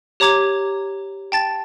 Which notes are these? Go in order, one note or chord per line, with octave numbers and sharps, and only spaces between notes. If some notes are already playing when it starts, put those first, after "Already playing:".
G4 C#5 A#5 D6 G#6
G5 A5 A6